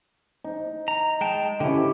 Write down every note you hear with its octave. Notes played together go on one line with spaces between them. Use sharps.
D#4
A#5
G#3 G5 A5
D3 C#4 E4 G4